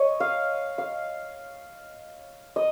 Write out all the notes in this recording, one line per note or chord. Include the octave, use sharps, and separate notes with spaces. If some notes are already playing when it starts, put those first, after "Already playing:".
Already playing: C#5 D#5
F5
F5
D#5